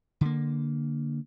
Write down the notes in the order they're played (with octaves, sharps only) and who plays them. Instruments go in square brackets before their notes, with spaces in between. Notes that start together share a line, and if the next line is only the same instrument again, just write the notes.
[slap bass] D3 A#3